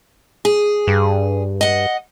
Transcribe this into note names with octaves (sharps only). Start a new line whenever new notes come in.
G#4
G2
D#5 F#5